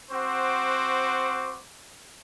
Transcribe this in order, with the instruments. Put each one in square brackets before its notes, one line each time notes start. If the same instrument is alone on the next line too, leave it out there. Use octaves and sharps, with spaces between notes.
[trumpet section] C4 F#4 C5 F#5 C#6 D6